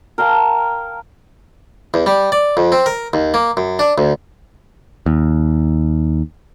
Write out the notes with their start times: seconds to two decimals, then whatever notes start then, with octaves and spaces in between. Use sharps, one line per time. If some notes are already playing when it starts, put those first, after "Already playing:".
0.18 A#4 F5 G5 A5
1.94 E2
2.06 G3
2.32 D5
2.57 F2
2.72 C4
2.86 A#4
3.13 D#2
3.34 A#3
3.57 F#2
3.79 D4
3.98 D2
5.06 D#2